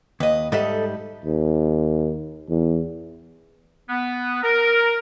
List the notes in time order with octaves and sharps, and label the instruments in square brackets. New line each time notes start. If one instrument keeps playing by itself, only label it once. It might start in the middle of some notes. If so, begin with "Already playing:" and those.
[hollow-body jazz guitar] D#2 [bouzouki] B4 D#5
[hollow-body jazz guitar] G#2 G3 E5 [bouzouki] A4 D#5
[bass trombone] D#2
E2
[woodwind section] B3
A#4